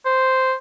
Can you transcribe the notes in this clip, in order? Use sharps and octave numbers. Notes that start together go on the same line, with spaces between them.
C5